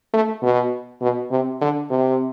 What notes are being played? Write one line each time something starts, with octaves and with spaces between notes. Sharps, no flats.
A3
B2
B2
C3
D3
C3